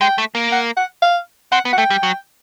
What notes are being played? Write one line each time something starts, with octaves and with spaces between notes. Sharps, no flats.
G#3 G5
A3
A#3
F#5
F#5
F5
C4 F#5
B3
F#5
A3 G5
G3
F#3